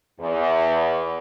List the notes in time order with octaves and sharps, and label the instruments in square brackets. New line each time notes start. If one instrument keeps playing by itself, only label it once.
[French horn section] E2